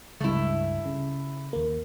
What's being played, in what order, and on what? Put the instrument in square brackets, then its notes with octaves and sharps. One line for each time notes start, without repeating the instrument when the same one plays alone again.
[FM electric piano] C#2 G2 [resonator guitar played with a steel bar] A3 E4
[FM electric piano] C#3
D#2 A#3